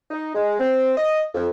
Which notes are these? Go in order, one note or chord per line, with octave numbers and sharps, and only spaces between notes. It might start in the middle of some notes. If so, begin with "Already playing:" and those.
D#4
G#3
C4
D#5
F2